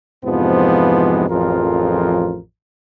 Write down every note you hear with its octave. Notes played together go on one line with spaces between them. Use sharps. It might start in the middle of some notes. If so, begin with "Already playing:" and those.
F2 G#2 C3 E3 F3 B3
A1 F2 F3 F4 G#4 A#4